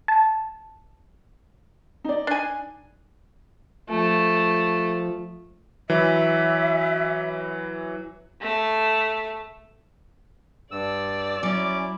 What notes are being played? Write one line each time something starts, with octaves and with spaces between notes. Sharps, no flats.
A5
D#4 D5
D4 G#5
F3 A3
E3 F#3 E5
A3 A5
G2 D5 E6
F#3 C#4 E4 D6